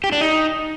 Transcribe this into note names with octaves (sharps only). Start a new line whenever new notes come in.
G4
D4
D#4